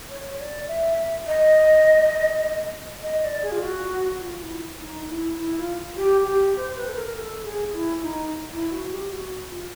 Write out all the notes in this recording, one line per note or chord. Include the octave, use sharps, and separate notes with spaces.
C#5
D5
E5
D#5
D#5
D5
G#4
F4
F#4
F4
E4
D#4
E4
E4
F4
G4
G4
C5
B4
A4
A#4
A#4
A4
G#4
E4
D#4
E4
F#4
G4
F#4
F4